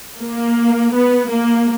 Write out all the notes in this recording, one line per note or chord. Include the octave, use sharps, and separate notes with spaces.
A#3
B3
A#3